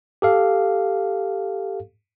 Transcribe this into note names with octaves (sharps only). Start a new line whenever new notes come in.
G4 A4 F5